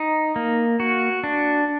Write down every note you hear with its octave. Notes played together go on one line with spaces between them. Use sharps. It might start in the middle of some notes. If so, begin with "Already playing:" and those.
Already playing: D#4
A#3
F#4
D4